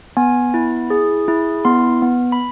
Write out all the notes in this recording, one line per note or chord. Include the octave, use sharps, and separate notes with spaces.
B3 G#5
E4
G#4
E4
B3 C6
B3
B5